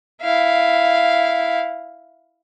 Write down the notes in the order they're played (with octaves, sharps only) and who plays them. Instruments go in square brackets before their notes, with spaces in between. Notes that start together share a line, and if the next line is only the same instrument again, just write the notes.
[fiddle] E4 F5